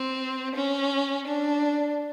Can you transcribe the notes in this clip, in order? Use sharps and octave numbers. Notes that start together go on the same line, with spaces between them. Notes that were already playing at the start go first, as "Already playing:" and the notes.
Already playing: C4
C#4
D4